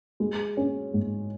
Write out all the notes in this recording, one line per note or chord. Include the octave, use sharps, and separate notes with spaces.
G#3
C#4
G#2